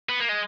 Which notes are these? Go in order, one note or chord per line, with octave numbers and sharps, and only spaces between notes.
B3
A#3
G#3